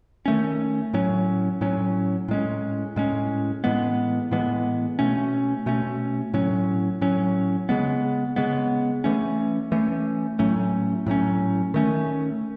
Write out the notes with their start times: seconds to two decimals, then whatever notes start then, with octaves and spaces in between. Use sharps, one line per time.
0.26 D#3 A3 C#4
0.93 A2 F#3 C#4
1.61 A2 F#3 C#4
2.28 A2 G#3 C#4
2.96 A2 G#3 C#4
3.64 A2 E3 G#3 B3
4.31 A2 E3 G#3 B3
4.99 B2 A3 C#4
5.66 B2 A3 C#4
6.34 A2 F#3 C#4
7.01 A2 F#3 C#4
7.69 C#3 G#3 B3
8.36 C#3 G#3 B3
9.04 E3 A3 C#4
9.72 E3 A3 C#4
10.39 A2 F#3 A3 C#4
11.06 A2 F#3 A3 C#4
11.74 D#3 A3 C#4